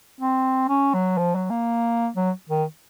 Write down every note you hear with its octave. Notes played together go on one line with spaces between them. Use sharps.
C4
C#4
F#3
F3
F#3
A#3
F#3
D#3